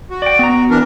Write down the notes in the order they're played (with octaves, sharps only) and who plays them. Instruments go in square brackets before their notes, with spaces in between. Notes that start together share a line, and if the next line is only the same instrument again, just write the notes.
[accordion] F#4
[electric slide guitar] D5 G5
B3 A#5
[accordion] E3 D4 A#4